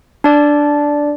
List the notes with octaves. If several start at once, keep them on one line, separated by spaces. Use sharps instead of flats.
D4 D5